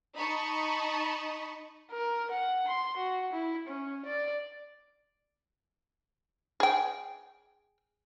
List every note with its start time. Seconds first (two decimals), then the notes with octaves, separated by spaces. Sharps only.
0.17 D#4 D#5 A5 B5 C#6
1.91 A#4
2.31 F#5
2.68 C6
2.97 F#4
3.33 E4
3.67 C#4
4.05 D5
6.60 G#4 G5